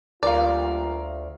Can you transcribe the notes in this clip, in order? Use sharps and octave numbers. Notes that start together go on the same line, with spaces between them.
D2 G3 A#3 F4 A#4 D5 F5